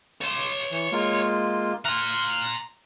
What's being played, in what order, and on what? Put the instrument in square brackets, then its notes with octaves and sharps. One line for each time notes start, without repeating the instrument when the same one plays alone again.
[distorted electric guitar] C#5 C6
[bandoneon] E3
G#3 A#3 F4
[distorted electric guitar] A#5 C6 [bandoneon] F6 F#6